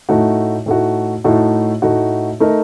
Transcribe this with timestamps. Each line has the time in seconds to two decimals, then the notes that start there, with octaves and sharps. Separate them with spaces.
0.09 A2 A3 D#4 F#4
0.66 A2 A3 D#4 F#4
1.24 A2 A3 D#4 F#4
1.82 A2 A3 D#4 F#4
2.40 A3 D#4 A#4